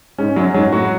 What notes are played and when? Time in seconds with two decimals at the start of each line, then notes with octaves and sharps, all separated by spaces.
0.18 G#2 C#4
0.36 F#2 F#3
0.54 G#2 F#3
0.73 A2 F#4